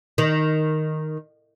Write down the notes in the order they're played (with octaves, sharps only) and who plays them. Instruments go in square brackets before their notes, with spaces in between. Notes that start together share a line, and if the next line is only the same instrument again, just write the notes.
[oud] D#3